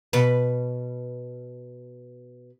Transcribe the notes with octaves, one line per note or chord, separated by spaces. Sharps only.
B2 B4